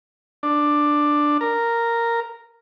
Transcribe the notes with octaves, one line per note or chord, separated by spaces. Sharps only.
D4
A#4